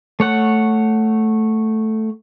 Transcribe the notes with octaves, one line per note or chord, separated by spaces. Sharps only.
A3 C#5 F#5